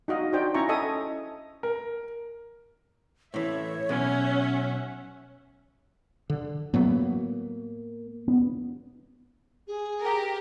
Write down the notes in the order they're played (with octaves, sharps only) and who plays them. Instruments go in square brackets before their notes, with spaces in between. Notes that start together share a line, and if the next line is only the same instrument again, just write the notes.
[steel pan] D#4 F#4 D#5 F5
D4 D#4 F#4 C5 D5 G5
C#4 E4 E5 G#5 A#5 C#6
A4 D#5 E5 G#5 A5 D#6
[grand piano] A#4
[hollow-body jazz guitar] A2 E3 [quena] C#5 [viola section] E5
[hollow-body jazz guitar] B1 [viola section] C#4 E5 F#5
[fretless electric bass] D3
[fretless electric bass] A2 F#3 B3 [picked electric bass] A#3
[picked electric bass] B3
[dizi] G#4
[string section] G4 A#4